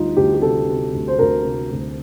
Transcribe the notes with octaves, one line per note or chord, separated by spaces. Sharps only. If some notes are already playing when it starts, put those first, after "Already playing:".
Already playing: D2 G3 D#4 F4
D2 G4
G4
C3 A4
C3
D2
C5
D2 A#4
C3
D2